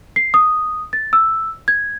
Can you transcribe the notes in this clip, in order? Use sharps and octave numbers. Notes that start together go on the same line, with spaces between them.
C7
D#6
A6
E6
G#6